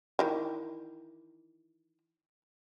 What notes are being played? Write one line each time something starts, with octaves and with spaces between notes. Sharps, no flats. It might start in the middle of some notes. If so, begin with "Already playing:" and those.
D#3 E3